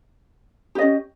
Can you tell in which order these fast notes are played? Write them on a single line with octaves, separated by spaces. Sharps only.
G4 D#5 C#4